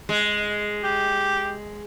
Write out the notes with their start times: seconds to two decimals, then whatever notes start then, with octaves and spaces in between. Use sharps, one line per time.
0.09 G#3
0.84 G4